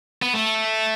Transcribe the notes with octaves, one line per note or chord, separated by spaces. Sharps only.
B3
A3